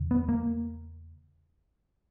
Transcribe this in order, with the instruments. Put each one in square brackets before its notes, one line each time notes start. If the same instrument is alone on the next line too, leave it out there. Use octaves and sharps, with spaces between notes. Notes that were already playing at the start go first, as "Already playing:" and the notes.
Already playing: [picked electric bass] E2 C#3
B3
A#3